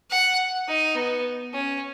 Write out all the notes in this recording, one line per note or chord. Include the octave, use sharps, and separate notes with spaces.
F#5
D#4
B3
C#4